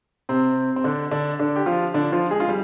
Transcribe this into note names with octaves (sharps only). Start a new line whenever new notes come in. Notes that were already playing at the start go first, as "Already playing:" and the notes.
C3 C4
C4
D3 D4
D3 D4
D3 D4
G4
F3 F4
D3 D4
F3 F4
G#3 G#4
F4
G3